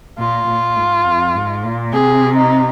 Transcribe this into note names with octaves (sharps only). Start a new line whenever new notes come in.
A#2 F4
A#2
G#2
F2
G#2
A#2
C3 G#4
D#4